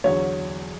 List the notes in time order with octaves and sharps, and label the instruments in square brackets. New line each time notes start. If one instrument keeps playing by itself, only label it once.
[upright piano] E2 D3 F#3 C#5